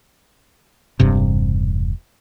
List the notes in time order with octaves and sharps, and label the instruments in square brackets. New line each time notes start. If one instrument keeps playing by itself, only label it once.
[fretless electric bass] E1 G2 C3